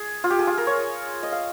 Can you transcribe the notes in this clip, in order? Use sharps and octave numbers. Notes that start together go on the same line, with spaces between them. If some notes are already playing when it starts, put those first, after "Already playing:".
Already playing: G#4
F4
G4
G#4
F4
A#4
C#5
D#5
F5